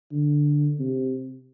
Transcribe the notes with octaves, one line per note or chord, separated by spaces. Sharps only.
D3
C3